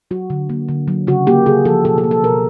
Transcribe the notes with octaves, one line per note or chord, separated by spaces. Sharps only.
F#3 F#4
D3
A#3
D3
F#3
C#3 F#4
A#3 G4
C#3 G#4
F3 A4
B2 A4
A4
A#3
A4
B2 A#4